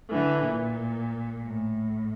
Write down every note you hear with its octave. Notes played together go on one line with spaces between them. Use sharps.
D3 E3
A#2
A2